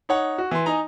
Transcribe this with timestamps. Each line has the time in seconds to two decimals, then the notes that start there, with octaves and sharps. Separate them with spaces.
0.09 D#4 C#5 F#5
0.38 F#4
0.51 E3 C6
0.66 D#4 G#5 A#5